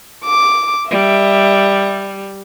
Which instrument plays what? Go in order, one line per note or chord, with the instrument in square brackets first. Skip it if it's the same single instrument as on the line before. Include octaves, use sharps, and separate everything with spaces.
[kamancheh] D6
[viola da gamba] G3 [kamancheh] E5